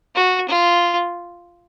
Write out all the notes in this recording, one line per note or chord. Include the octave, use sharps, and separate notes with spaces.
F#4
F4